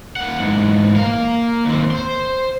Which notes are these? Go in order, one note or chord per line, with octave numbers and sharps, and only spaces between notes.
A#3 F#5
G#2 E3
A#3 F5
D#2 C4
C5 C6